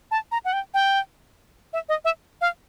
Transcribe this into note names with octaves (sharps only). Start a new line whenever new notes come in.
A5
A#5
F#5
G5
G5
E5
D#5
E5
F5